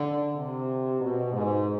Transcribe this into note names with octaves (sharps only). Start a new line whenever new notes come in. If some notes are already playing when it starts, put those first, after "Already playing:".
Already playing: D3
C3
B2
G#2